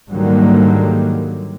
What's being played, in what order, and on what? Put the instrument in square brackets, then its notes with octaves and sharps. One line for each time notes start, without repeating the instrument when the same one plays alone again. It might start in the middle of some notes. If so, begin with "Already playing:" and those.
[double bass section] G#2 D3 D#3 F#3 G3 A#3